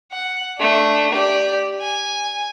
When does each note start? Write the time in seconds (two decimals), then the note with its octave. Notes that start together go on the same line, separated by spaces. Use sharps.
0.12 F#5
0.58 A3 D4
1.11 G4 D5
1.81 G#5